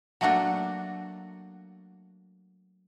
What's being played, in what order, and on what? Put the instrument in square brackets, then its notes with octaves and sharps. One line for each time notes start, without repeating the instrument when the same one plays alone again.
[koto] F#3 A3 A#3 D4 F#4